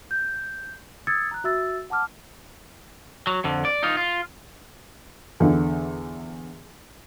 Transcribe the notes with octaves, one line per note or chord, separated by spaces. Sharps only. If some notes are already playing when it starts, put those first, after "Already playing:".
G6
D#6 E6 G#6 A6 C#7
A#5 F#6
F#4 E5 E6 A6
F#5 A5 D6 F6
F#3
F2 D3
D5
D#4 F4
F4
E2 D3